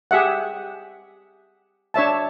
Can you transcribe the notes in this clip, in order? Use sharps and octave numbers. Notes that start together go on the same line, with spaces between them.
G4 G#4 E5 F#5
D4 C#5 E5 A5